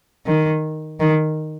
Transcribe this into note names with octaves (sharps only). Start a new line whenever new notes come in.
D#3
D#3